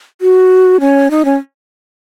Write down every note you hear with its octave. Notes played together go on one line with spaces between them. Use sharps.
F#4
C#4
D#4
C#4